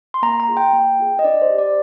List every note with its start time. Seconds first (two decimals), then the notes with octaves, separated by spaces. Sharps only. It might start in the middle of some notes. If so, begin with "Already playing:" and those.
0.14 C6
0.22 A#3 A#5
0.40 A#5
0.48 F4 G#4
0.57 G5
0.73 A#3
0.99 F4 G#4
1.19 D#5
1.24 D4 D5
1.42 C5
1.50 G4
1.58 D5